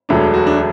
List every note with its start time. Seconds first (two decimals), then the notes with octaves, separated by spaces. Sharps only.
0.09 E1 D2 D3 F#3 D4
0.34 F#4
0.47 D4